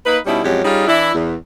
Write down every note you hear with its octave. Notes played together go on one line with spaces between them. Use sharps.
A#3 D#4 B4
B2 G3 C#4 D#4 E4
F2 F#3 G#3 C#4 G4
G3 C#4 D#4 F4 G#4
E3 D4 E4
E2